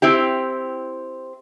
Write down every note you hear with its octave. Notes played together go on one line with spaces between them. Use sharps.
C4 E4 G4